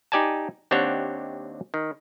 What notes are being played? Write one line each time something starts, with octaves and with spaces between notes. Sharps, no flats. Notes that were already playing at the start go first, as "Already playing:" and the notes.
D#4 G4 D5 G#5 A5
D#2 C4 D4 G4 C#5 F#5
D#3